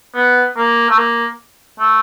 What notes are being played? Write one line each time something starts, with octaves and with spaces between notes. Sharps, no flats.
B3
A#3
A3
A#3
A3